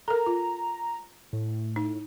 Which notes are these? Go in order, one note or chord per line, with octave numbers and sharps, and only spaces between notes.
A4 A#4 A#5
F4
A2
D#4